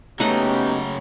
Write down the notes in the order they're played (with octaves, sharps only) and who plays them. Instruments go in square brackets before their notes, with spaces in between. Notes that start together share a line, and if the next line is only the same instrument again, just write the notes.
[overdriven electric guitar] C#3 F#3 [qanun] A3 F#5 [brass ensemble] B3 C#4 G4 [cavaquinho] D#4